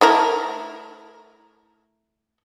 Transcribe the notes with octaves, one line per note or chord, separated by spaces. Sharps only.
A3 E4 A#4